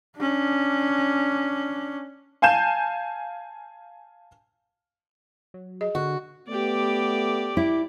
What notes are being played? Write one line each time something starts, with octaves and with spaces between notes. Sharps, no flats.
C#4 D4
F5 G#5 A5 G6 E7
F#3
G#4 D#5
D3 F#4
A3 B3 G4 D5
E4